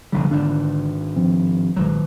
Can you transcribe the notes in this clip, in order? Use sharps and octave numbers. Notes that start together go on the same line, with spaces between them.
F1 A#1 D3 G3
G#1 G#2 D4
A2 F3 C4
B1 A#2 D#3 F#3 G#3